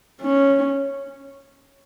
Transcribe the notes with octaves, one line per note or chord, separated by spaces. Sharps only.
C#4